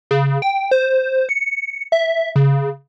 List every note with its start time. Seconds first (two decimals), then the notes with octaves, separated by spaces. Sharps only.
0.11 C#3
0.42 G5
0.71 C5
1.29 C#7
1.92 E5
2.36 C#3